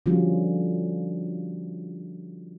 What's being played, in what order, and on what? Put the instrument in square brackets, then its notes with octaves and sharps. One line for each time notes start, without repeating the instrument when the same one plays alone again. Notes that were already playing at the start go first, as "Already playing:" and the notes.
[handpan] D3 F3 G3 C#4 F4 F#4